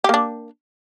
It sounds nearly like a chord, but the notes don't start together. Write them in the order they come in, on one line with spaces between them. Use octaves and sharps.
G4 A#3 D4